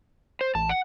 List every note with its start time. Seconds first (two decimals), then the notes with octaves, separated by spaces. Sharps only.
0.41 C5
0.55 A1 A5
0.69 F#5